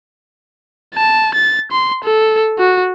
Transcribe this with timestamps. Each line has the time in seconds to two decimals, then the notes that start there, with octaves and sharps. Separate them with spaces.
0.95 A5
1.34 A6
1.72 C6
2.04 A4
2.59 F#4